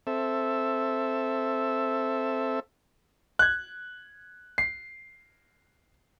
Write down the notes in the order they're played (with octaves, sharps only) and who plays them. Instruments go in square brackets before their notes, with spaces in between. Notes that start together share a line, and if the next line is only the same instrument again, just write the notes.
[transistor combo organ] C4 A4 E5
[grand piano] F#6 G#6
C7